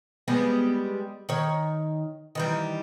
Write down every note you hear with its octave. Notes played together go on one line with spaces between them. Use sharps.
G3 G#3 B3
D#3 C#5
D#3 E3 G3